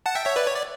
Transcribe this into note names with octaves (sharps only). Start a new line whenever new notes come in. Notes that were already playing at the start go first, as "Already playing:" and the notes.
F#5 A5
E5 G5
C#5 E5
B4 D5
C#5
D5